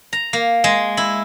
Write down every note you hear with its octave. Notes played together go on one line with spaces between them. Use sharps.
A#5
A#3
G#3
E4